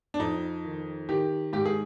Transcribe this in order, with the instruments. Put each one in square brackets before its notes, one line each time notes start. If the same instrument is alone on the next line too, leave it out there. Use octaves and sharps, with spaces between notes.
[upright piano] D4
F2 D#4
D#3
D#3 G4
G#2 G4
G#4